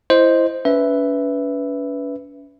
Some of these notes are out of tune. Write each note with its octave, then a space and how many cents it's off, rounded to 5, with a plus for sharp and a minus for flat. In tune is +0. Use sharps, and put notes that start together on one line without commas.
E4 +15 C5 +0 D#5 +0
C#4 +45 B4 +0 E5 +0